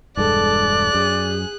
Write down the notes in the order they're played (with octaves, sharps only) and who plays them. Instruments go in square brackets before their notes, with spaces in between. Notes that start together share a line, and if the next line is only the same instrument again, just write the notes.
[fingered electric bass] E1 G2 G#3 [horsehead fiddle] A4 [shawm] D5 [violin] F#6
[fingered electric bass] F#2 [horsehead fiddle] G#4